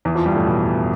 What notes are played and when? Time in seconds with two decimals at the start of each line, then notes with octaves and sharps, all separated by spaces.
0.05 E2 E3
0.15 F2 F3
0.26 G2 G3
0.36 A2 A3
0.46 B2 B3